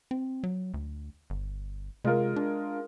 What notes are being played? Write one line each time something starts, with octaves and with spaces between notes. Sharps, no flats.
C4
F#3
D2
G1
C3 G#3 F4 A#4
D4